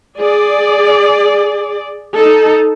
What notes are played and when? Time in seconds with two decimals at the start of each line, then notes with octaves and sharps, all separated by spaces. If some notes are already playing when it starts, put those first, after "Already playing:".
0.19 G#4 D5
2.16 D#4 A4